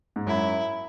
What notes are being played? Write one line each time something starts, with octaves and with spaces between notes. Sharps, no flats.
G#2
F#2 E4